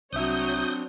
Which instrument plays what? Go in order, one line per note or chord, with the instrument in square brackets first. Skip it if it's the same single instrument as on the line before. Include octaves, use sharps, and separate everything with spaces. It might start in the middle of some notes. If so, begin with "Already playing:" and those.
[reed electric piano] C2 E5 [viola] F#3 C#5 [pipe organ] C4 D4 [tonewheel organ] D#6 G6